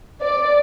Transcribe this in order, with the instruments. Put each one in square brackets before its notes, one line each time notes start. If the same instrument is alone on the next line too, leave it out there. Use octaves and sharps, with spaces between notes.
[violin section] D5